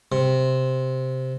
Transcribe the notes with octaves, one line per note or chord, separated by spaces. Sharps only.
C3